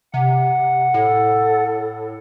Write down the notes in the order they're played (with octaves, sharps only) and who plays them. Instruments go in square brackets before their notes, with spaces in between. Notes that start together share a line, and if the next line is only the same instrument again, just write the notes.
[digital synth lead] C3 [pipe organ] F#5
[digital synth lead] A2 [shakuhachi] A4